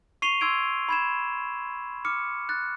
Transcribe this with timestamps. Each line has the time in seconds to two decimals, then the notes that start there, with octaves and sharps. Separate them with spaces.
0.22 C#6 C7 D#7 F7 G7
0.41 C6 E6 G#6 D7
0.89 B5 G#6 E7
2.05 D6 F6 C#7
2.49 F#6 A6